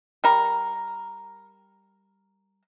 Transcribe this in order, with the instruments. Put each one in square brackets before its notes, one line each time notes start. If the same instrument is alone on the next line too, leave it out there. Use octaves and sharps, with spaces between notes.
[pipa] G3 A#4